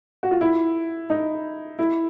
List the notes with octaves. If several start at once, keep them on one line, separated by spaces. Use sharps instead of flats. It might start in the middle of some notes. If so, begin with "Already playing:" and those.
F#4
F4
E4
D#4
E4